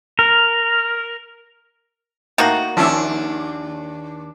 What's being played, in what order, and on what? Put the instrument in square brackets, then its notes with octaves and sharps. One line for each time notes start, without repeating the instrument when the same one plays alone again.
[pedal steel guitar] A#4
[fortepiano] A2 [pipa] D#3 A#3 F#4
[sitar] D#2 D4 [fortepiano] F3 C#4 E5